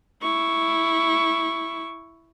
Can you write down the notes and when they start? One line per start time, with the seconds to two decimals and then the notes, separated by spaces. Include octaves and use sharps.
0.22 E4 C#6